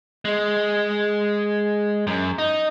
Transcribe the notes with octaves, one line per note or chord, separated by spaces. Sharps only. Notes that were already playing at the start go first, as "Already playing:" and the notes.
G#3
F#2
D#4